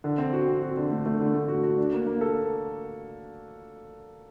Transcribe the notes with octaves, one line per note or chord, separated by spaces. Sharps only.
D3
C4
F#4
C4
F#4
D3
A3
A3
D3
A3
F#4
F#4
D4
A#3
A#3
A4